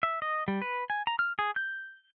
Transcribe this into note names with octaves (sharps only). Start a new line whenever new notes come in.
E5
D#5
G3
B4
G#5
A#5
F6
G#4
G6